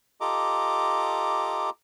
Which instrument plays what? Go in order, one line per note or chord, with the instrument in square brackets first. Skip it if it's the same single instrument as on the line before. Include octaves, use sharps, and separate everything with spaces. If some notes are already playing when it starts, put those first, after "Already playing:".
[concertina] F4 G4 A4 D#5 A#5 D6